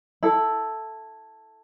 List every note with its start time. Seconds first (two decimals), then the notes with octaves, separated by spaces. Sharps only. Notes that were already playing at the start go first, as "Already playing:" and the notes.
0.23 E4 A4